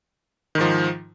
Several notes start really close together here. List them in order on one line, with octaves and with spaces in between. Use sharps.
D#3 G#2 F3